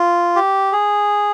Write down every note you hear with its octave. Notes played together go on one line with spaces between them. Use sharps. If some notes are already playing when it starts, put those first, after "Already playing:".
Already playing: F4
G4
G#4